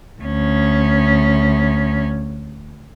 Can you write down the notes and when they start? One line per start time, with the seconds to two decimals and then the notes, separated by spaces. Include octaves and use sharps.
0.22 D2 C#4